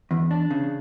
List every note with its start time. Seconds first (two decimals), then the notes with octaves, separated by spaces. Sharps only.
0.11 E2
0.31 D4
0.50 C#3